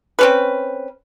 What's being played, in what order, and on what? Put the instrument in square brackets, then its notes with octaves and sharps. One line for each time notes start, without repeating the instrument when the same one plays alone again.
[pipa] C4 C#4 B4